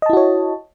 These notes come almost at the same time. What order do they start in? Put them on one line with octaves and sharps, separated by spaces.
D#5 A5 E4 F#4 C#5